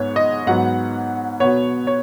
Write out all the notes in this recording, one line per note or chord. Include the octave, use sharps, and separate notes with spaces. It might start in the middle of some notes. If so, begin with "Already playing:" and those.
Already playing: G#2 G#3 B3 C#5
D#5
G#2 F#3 B3 F#5
B2 B3 C#5
C#5